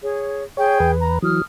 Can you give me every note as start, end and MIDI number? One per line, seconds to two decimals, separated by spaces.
0.03 0.43 68
0.03 0.43 73
0.57 0.92 68
0.57 0.79 73
0.57 0.92 79
0.80 1.19 40
0.80 1.19 71
1.01 1.16 82
1.22 1.41 52
1.22 1.41 54
1.22 1.43 87
1.22 1.43 89